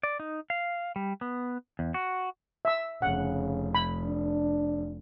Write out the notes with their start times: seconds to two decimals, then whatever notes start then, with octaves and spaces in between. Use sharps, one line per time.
0.03 D5
0.20 D#4
0.50 F5
0.96 G3
1.21 B3
1.79 E2
1.94 F#4
2.65 E5 E6
3.02 F1 C#3 F#5
3.75 B5
4.05 D4